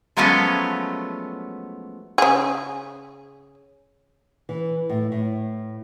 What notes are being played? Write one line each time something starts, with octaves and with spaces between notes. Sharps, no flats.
F3 F#3 G#3 A3 B3 C#4
C#3 G#4
E3
A2
A2